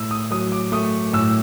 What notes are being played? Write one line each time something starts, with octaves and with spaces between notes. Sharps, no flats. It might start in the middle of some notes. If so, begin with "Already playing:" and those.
Already playing: A2 E6
D#6
F#3 D#6
D6
A3 D#6
A2 E6